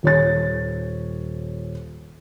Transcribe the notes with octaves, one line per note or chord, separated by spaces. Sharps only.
D#1 C#5 A6